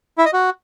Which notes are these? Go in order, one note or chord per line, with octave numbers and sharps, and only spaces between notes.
E4
D#5
F#4